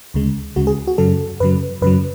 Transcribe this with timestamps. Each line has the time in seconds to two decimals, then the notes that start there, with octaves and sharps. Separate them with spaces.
0.14 D2 C#3 G#3
0.56 D2 C#3 G#3 F#4
0.67 G#4
0.87 F#4
0.98 F#2 C#3 F#3 A4
1.40 F#2 C#3 F#3 B4
1.82 F#2 C#3 F#3 B4